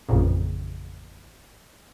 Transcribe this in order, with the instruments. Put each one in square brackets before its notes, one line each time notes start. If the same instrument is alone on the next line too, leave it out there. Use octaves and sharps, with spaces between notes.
[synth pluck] A1 F2 A#2 C#3